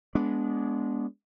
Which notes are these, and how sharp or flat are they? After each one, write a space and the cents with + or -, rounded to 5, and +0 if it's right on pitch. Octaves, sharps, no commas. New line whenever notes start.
G#3 +0 B3 -10 D4 -25